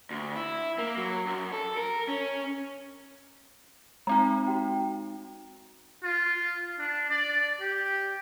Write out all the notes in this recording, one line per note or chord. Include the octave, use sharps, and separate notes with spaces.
D2
E4
A#3
F#3
F#2
A4
A#4
C#4
G#3 C4 D#4 A#5
F#4 G5
F4
D4
D5
G4